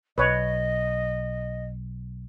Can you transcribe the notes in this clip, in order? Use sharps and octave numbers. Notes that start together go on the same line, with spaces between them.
B1 B4 C#5 D#5